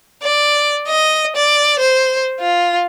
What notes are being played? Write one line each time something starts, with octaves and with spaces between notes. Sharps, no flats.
D5
D#5
D5
C5
F4